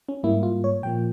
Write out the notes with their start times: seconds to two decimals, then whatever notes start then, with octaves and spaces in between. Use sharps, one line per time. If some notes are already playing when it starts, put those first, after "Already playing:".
0.09 C#4
0.23 G#2 G3 A#3 E4
0.43 F4
0.64 C#5
0.83 A#2 F3 A#3 G5